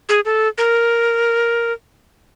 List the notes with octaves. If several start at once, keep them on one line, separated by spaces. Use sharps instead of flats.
G#4
A4
A#4